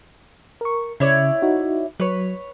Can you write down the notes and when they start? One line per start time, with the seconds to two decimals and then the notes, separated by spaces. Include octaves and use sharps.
0.61 A#4 C#6
1.00 C#3 E4 C#5 D5
1.42 D#4 F#4
2.00 F#3 B4 C#5